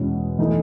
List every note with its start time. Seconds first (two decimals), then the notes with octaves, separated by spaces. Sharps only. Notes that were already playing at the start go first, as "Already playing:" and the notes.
Already playing: E2 B2 G#3 C#4 E4
0.39 E3 A3 D#4